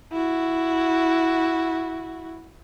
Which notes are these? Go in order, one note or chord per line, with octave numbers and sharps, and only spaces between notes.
E4 F#4